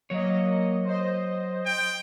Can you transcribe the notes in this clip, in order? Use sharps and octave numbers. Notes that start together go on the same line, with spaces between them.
F#3 A#3 C#5 D#5
C5 D#5
G5